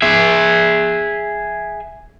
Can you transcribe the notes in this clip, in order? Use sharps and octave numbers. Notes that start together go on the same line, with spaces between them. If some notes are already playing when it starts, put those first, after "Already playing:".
G#4 E5